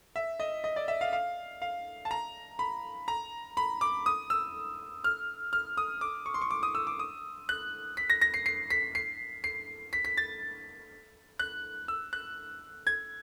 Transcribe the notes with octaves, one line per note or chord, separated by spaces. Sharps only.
E5
D#5
D#5
D5
E5
F5
F5
F5
A5
A#5
B5
A#5
B5
D6
D#6
E6
F6
F6
D#6
D6
C#6
C6
C#6
D6
D#6
E6
D6
D#6
F#6
B6
A#6
A#6
C7
C7
B6
C7
C7
B6
B6
A6
F#6
E6
F#6
G#6